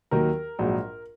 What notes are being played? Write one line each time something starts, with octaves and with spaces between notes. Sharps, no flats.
D#2 D#3 F#3 A#4
A#1 G#2 F#3